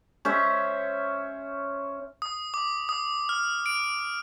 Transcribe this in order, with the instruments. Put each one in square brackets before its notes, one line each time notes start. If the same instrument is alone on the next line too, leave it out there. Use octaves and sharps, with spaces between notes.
[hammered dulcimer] C#4 C5 E5
[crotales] D#6
D6
D#6
F6
D7